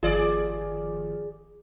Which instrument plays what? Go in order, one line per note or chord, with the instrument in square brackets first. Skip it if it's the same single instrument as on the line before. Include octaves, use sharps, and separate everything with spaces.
[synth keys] G1 D#3 F3 [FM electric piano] F4 [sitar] G#4 D5